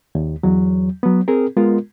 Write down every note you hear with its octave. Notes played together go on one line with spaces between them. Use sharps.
D#2
E2 F#3
F#3 B3
C4 G#4 A#4
G#3 B3 F4 A#4